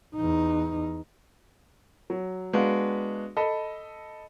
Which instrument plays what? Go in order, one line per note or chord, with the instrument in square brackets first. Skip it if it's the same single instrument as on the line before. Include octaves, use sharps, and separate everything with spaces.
[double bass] E2 D#4
[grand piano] F#3
G#3 B3 D4 F#4 B4 F5
A4 D#5 B5